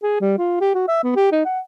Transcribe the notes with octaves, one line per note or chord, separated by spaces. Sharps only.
G#4
G3
F4
G4
F#4
E5
B3
G4
D#4
F#5